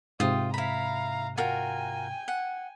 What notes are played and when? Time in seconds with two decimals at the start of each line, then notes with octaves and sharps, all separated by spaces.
0.20 G#2 C3 F4 C5 G5 D#6
0.54 E4 F5 A#5 B5
1.37 F4 F#4 A#4 G5 G#5
2.28 F#5